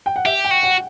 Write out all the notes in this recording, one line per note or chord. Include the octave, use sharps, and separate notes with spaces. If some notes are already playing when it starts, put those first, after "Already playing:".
G5
F#5
G4 E5
G5
F#4
F#5